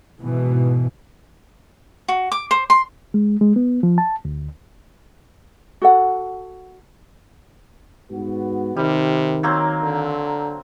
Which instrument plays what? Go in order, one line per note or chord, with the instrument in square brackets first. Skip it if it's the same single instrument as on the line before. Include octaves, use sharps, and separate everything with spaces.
[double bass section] G#2 B2 E3
[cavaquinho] F#4
D6
C5
C6
[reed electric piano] G#3
G#3
B3
F3
A5
D2
[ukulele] F#4 A4 F#5
[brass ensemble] G#2 B3 F#4
[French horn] C3 [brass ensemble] D#3 [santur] G3
[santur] F#3 A#3 C4
[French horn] D3